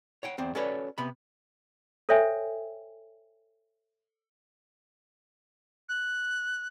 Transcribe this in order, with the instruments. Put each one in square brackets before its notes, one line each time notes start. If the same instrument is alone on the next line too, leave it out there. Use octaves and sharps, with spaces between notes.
[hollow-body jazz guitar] C#5 F#5 G5
E2 C4 C5
C#4 F#4 A4 B4 C#5 D5
C3 B3 B5
[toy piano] A4 C5 C#5 E5 G5 G#5
[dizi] F#6